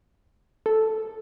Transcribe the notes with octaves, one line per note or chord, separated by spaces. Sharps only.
A4